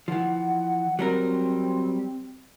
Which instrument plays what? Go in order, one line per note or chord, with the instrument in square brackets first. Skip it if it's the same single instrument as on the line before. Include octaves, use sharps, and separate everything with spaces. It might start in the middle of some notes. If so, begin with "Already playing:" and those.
[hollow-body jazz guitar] E3 F3 [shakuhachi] F#5
[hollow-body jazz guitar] F#3 G3 A#4 [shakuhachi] C4